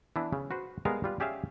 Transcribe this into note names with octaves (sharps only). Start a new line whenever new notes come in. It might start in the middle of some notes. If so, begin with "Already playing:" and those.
E3 B3 D4 E4 B4
C#3
F#4 B4 C5
G3 G#3 B3 G#4 A#4 F5
G3 F4 B4
C#4 G4 G#4 D5 E5 F5